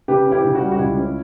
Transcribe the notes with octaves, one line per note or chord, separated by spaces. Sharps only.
C#3 G4 B4
C#4
E4 G4
C#3
F#4
G3
F#4
C#2 E4
C#4